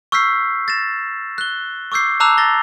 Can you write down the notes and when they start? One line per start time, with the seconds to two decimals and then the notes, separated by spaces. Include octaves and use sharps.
0.12 C#6 E6 F6 G6 B6 C7
0.68 A6 A#6 E7
1.38 F#6 G7
1.92 C#6 D6 E6 G6 C7
2.20 A5 A#5 D6 E6 F#6 F7
2.38 A6 A#6 G7